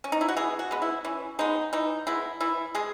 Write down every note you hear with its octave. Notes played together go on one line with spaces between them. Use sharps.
C#4
D#4
E4
F#4
E3 G#4
F#4
G#3 B3
E4
E3 C#4
G#3 B3 D#4
E3 D#4
G#3 B3 E4
E3 E4
G#3 G#4